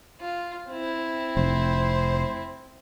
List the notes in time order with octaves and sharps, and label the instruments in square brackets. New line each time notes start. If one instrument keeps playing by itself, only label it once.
[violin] F4
C4 E4
[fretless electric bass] F1 [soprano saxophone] C5